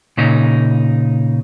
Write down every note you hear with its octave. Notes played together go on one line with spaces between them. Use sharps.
A#2 C#3 D#4